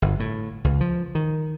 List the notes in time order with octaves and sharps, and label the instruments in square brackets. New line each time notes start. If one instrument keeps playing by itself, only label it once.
[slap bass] G1
A2
C#2
F3
D#3